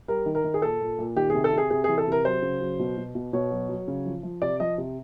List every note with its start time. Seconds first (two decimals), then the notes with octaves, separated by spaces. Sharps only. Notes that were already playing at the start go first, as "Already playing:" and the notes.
0.08 G3 A#4
0.26 D#3
0.35 A#4
0.44 D#3
0.54 G#4
0.62 A#2 A4
0.81 A#2
0.99 A#2
1.16 D#3 G4
1.30 G#4
1.34 C3
1.44 A4
1.52 C3
1.58 G#4
1.70 C3 G#4
1.84 E3 G#4
1.98 A4
2.07 C3 A#4
2.25 F#3 C5
2.42 C#3
2.61 F#3
2.79 B2
2.97 B2
3.15 B2
3.33 B2 C#5
3.51 F#3
3.69 F#3
3.88 C#3
4.06 F3
4.23 F3
4.42 C3 D5
4.60 F3 D#5
4.78 C3